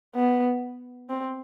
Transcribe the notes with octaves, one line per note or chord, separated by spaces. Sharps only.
B3
C4